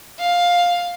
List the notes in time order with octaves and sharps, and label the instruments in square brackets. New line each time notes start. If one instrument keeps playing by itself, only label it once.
[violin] F5